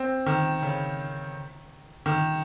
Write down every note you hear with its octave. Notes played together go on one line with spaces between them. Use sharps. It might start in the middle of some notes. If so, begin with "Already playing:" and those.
Already playing: C4
D#3
C#3
D#3